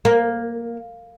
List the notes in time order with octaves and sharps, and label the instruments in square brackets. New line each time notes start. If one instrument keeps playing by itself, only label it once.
[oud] A#3